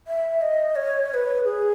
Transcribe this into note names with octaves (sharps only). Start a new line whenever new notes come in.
E5
D#5
C#5
C#5
B4
G#4